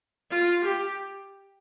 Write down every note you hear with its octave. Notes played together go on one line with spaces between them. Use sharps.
F4
G4